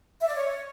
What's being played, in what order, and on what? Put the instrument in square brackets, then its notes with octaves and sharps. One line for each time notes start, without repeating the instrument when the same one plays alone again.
[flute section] E5
D5
C#5